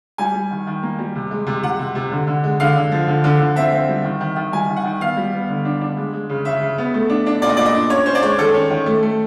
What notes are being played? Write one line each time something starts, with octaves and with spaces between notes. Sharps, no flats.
G3 G#5
G3
D#3
D#3
A#3
G3
C3
G#3
C3
C3 F#5
C3
C3
D3
D3
G#3
D3 F5
D3
F3
D3
D3
D3
C4 E5
C4
G3
D#3
D#3
D#3
G3 G#5
D#3
F#5
D#3
B3 F5
G3
B3
D3
D4
D4
G#3
G#3
C#3
C#3 E5
C#3
B3
A3
D4
D4
A#2 D5
D#5
A#2 D5
D#5
D4
C#4 C#5
C#4 C5
D5
G#3 C#5
D#3 A4
C#4
D#3
A3
A3